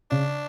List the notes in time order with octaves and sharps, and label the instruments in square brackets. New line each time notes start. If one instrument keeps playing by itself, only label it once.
[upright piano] C#3 [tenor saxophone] D4